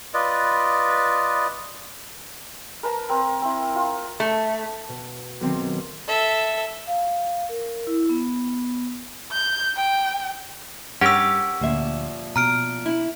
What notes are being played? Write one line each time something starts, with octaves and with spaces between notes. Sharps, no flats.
F4 B4 D5 D#5
A#4 B4 A5 A#5
C4 A#4
C4 E4
F4
A3
B2
B1 D#3 C4
A4 E5
F5
A#4
E4
B3
G6
G5
G2 C#4 G4 A#4 F#5 E6
D2 A#2 F3 E5
B2 A#5 F6 D7
E4